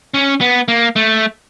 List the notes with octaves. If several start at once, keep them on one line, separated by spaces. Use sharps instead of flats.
C#4
B3
A#3
A3